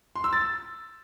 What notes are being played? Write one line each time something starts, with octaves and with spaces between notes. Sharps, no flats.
C6
E6
A6